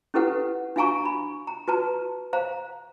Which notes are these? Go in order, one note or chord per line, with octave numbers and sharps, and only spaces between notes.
C#4 E4 G4 A4 B4 F#5
D4 F#4 F5 G#5 A#5 C#6
B5
A#5
F#4 B4 A5 A#5
C5 F5 A#5